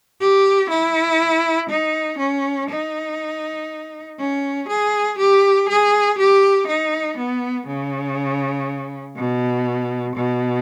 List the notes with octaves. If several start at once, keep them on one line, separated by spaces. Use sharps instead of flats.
G4
E4
D#4
C#4
D#4
C#4
G#4
G4
G#4
G4
D#4
B3
C#3
B2
B2